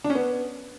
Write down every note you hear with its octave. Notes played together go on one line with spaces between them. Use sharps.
D4
C#4
B3